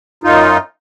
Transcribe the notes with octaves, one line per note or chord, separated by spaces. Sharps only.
F#2 D#4 F4